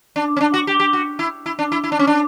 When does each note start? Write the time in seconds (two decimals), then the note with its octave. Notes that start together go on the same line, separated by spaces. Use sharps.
0.16 D4
0.37 C#4
0.41 D4
0.54 F#4
0.67 G4
0.80 G4
0.93 F#4
1.19 E4
1.46 E4
1.59 D4
1.72 E4
1.84 E4
1.92 D4
1.99 C#4
2.07 D4